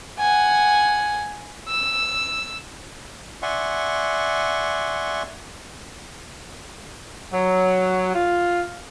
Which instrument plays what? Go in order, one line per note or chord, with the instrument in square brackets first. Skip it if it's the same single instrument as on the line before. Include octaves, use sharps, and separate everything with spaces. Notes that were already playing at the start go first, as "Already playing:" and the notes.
[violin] F#5 G#5
E6
[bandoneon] D5 E5 F#5 G#5 C6 C#6
[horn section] F#3
F4